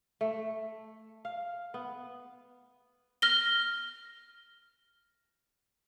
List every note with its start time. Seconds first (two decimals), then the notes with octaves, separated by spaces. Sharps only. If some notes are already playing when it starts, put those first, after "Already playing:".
0.21 A3
1.25 F5
1.74 B3
3.22 F6 A#6 G7